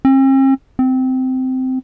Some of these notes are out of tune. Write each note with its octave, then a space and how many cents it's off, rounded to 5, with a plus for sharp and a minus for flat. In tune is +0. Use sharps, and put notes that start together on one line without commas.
C4 +45
C4 -15